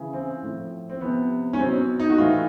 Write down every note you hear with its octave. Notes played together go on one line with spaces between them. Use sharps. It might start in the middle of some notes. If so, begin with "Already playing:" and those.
Already playing: C#3 E3
C4
A2 F3
C4
C3 F3 B3
C#4
B2 F#3 C4
D#4
F#4
A2 E3 F4